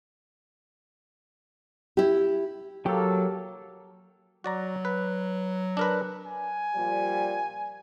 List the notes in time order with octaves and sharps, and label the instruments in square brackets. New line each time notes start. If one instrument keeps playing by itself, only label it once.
[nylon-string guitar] E4 G4
[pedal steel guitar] F#3 [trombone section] A#3 A4 [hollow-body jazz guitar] G4
[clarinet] F#3 [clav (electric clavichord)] F#4 D5 A#5
[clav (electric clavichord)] B4
D4 A#4 B4
[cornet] G#5
[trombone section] A#2 F3 G3